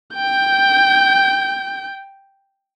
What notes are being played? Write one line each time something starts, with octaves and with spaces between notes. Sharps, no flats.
G5 G6